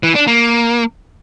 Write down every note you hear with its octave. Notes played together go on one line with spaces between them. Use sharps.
E3
D4
A#3